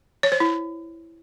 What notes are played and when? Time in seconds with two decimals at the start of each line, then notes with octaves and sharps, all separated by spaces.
0.23 C#5
0.32 C5
0.40 E4